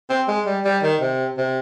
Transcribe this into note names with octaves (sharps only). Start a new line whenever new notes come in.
C4
G#3
G3
G3
D#3
C3
C3